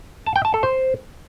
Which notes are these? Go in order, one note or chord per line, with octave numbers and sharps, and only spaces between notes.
A5
G5
A5
A4
C5